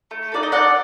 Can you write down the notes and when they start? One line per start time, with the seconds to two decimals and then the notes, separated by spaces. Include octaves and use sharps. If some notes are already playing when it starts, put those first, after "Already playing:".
0.11 A3
0.32 D#4 F#4 A4 D5
0.43 D#5
0.52 C4 D5 F#5